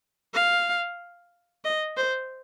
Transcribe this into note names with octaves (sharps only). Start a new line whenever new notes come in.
F5
D#5
C5